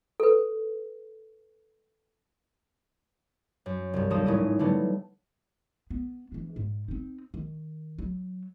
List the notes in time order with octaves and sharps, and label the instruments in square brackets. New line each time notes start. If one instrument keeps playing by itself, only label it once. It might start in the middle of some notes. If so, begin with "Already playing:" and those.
[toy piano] A4 B4
[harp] F#2
C2 G2
D#2 F3 A4 D#6 E7
G#1 A2 C#4 E4 D#6 D#7
D3 F#3 G3 A3 B3 A4
[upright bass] B3
E3 D4
G#2
C4 D#4
D#3
F#3